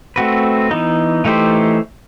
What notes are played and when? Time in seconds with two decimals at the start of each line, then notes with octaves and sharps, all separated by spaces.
0.16 A3 C4 F#4 B4
0.71 E3 B3 D#4
1.25 E3 A3 D#4 G4 C5